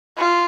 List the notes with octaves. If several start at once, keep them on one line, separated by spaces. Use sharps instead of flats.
F4